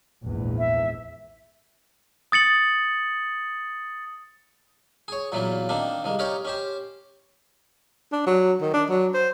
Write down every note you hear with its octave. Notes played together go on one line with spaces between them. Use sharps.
A#1 E2 G#2
E5
D#6 A6 C#7 F#7
G#4 C#5
E2 A#2 E3 F#3 A#3
D#3 A#3 C4 D4
C2 G#3 A#3
D#4 G4 A#4 C#5 D5
C#4 G4 C5
D4
F#3
D#3
D4
F#3
C5